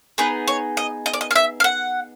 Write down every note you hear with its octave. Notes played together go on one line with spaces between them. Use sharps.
B3 D#4 G#4 B4
C#5
D#5
D#5
D5
D#5
F5
E5
F5
F#5